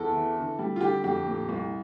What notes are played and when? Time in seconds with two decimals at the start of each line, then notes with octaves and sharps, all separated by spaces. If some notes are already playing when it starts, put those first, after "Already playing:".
Already playing: E2 A4
0.13 E3
0.36 D3
0.59 G3
0.76 F4
0.81 D3 G4
1.04 F2 G4
1.26 A#2
1.49 C2